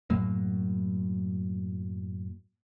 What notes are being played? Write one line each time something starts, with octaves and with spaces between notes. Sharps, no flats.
F#2 A2 F#3 A#3